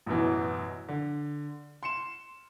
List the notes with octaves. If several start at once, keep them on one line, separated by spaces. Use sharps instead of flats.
A1 F#2 B2 E3
D3
C6 C#7 E7